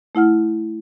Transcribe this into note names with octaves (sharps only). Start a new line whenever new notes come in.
A3 E4 F#5 F6